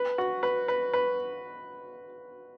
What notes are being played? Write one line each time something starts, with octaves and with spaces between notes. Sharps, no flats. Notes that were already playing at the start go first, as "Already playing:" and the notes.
Already playing: B4
F#4
B4
B4
B4